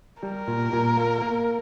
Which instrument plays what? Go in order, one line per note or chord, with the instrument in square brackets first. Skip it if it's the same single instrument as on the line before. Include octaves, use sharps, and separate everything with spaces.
[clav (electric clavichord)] G3 [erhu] A#4
[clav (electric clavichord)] A#2
A#2
A#3
A#3